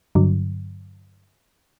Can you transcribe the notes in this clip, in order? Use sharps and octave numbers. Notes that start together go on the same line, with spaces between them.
G2 D3 F#3